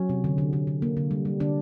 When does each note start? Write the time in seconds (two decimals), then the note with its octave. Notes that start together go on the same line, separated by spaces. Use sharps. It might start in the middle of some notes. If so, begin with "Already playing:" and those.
Already playing: F#3 C#4
0.09 C3
0.24 D3
0.38 D3
0.53 D3
0.67 D3
0.82 A#3
0.97 D3
1.11 G3
1.25 G3
1.40 D3 D4